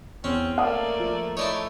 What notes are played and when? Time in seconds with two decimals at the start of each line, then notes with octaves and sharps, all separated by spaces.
0.24 E2 C4 C#4
0.58 A3 A#3 D5 F5 A5 D#6
1.00 F3
1.37 A3 D#4 E4 C#5 D5 A5